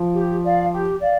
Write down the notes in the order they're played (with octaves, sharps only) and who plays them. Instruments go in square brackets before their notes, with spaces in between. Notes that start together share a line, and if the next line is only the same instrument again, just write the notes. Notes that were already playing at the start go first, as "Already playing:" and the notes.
Already playing: [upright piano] F3
[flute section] G4
D5 F5
G4
D5 F5